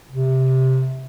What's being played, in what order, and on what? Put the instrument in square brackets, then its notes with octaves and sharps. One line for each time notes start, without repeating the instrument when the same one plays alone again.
[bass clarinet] C3